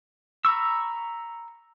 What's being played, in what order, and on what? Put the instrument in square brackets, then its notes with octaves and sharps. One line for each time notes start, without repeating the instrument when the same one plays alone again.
[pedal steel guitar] A#5 B5 C#6 E6